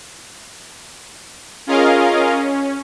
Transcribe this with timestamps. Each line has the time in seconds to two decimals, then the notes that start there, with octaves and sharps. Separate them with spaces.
1.67 C#4 F4 G#4 A#4 D#5 F5
2.30 C#4